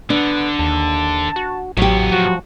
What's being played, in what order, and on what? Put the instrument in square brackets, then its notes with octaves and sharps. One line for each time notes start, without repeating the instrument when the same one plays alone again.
[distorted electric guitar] D3 [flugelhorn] B3 [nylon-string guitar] D4
[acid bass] D#2 [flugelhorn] A5
[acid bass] F#4
[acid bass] A1 [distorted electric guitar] A2 B3 [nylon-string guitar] F#3 G4
[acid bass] F3 [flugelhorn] F#4